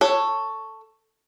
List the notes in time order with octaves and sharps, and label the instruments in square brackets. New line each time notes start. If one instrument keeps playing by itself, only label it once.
[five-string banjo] A4 C#5